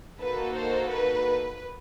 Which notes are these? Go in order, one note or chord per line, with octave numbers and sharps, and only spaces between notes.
A#3 D#4 F#4 A4 B4
C5
B4